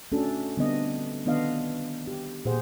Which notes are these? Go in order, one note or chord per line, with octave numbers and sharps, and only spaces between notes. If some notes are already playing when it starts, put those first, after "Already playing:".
A3 C#4 D4 F#4 A4
D3 G3 B3 C4 D4 D#5
D#3 B3 D4 F4 D#5 F5
G4
A#2 G4 G#4 C5 F#5